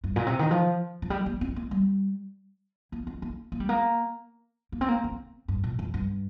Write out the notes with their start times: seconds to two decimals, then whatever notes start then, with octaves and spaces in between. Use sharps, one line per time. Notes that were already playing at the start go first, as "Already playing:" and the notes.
0.04 G2
0.16 A#2
0.27 C3
0.39 D#3
0.51 F3
1.02 F3
1.10 G3
1.26 A#3
1.41 C4
1.56 A#3
1.71 G3
2.92 A#3
3.07 C4
3.22 A#3
3.52 A#3
3.60 G3
3.69 A#3
4.72 A#3
4.81 C4
4.89 A#3
5.04 C4
5.48 G2
5.64 A#2
5.79 F2
5.94 G2